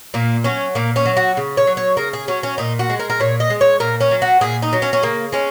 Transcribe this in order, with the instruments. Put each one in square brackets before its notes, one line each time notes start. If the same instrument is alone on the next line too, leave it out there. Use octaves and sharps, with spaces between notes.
[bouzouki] A#2 A#3
F#3 C#4
A#2 A#3
C#4
F#3
F#4
C#3
C#5
F#3
C#5
C#3 A#4
G#4
F#3 C#4
C#4
A#2 D#4
F#4
G#3
A#4
A#4
A#2 C#5
D#5
G#3
C#5
A#2 A#4
C#4
F#3
F#4
A#2 G#4
D#4
F#3
C#4
C#4
C#3 A#3
G#3 C#4